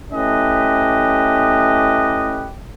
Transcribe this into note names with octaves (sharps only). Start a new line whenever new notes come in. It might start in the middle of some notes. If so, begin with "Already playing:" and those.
A3 C#4 E4 G4 B4 D#5